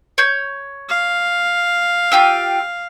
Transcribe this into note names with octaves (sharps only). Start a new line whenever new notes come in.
C#5 G6
F5
F4 G4 E6